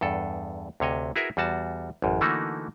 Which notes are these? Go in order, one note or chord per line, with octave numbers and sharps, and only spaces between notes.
E2 G2 A4
D2 C3 C#5 D#5
E4 F#4 G#4 A#4 B4 E5
E2 G3 F#4 A5
A1 F#2
D3 E3 A3 A#3 D#4 F#4